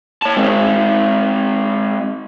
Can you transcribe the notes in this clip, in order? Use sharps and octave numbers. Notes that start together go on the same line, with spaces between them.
C#5 A5
G#3 C4